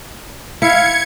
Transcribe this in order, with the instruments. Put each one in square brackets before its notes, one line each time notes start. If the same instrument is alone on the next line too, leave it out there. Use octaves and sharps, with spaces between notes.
[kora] E4 [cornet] F5 [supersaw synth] G#6 C#7